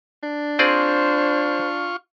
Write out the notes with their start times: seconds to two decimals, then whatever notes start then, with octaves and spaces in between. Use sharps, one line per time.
0.23 D4
0.59 C4 F4 G#4 C5 D5 C#6